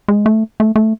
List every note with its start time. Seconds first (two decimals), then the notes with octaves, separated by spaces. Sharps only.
0.08 G#3
0.26 A3
0.60 A3
0.76 A3